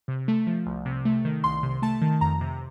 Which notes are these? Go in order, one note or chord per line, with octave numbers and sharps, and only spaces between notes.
C3
A3
F3
C2
C3
A3
D#3
C2 C6
C3
A3 A5
D#3
F2 A#5
C3